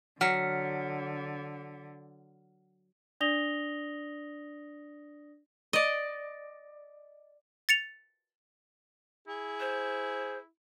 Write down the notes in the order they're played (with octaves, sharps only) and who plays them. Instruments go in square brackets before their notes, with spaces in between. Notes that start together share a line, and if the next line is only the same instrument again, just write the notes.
[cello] D3 [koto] F#3 [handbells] F#5 F6 [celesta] B6 C#7
[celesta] D4 D5 D#6 A#6 F7 G7
[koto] D5 D#5
[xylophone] A6 C#7 F7
[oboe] E4 [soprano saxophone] G#4
[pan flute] C5